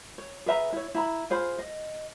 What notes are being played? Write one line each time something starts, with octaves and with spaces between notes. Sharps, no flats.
C#5
G#4 B4 E5 A#5
E4 C#5
E4 A#5 B5
F4 G#4 C5 B5
D#5